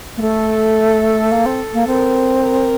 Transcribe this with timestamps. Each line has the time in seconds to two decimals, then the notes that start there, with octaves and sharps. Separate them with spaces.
0.17 A#3
0.22 A3 A4
1.32 A#3
1.46 C4
1.74 A#3
1.87 C4 A#4
2.43 A#4